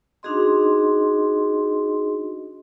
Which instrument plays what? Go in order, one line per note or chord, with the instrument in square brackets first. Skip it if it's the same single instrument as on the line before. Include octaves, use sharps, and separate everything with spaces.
[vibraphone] D4 D#4 F#4 G#4 D#5 C6